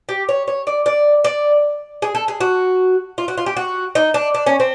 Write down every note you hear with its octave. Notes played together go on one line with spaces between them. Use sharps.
G4
C#5
C#5
D5
D5
D5
G#4
A4
G#4
F#4
F4
F#4
F4
G4
F#4
D#4
D4
D4
C#4
C4